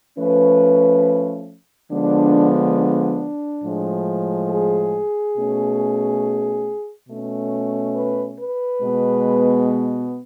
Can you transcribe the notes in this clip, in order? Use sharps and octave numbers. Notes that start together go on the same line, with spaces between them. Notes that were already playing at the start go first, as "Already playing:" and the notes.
F3 A3 C#4 B4
D3 F3 G#3 B3 D4
D4
A2 F3 G#3
G#4
B2 A3 C#4
B2 A3 C#4
B4
B4
B2 G#3 B3